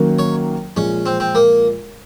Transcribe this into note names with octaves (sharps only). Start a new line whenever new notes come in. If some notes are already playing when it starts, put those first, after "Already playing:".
Already playing: D#3 F#3 A#3 C#4
C#5
A#2 F3 G#3 C#4
C4
C4
A#3